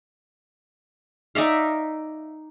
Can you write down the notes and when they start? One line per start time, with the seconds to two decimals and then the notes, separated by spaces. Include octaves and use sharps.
1.35 D#4 D5 E5 F5